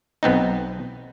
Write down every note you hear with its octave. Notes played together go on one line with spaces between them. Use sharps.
B1 B3 C4 D#4